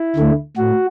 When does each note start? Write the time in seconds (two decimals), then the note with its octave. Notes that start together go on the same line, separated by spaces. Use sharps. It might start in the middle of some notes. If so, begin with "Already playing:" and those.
Already playing: E4
0.16 D2 D3 A3
0.57 A2 F#4